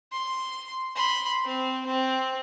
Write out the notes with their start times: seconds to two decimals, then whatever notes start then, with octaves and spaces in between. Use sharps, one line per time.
0.12 C6
0.96 B5 C6
1.45 C4
1.85 C4